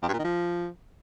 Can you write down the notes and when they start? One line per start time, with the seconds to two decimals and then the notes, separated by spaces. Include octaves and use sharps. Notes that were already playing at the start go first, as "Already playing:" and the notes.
0.03 F2
0.08 G2
0.14 A#2
0.19 D#3
0.24 F3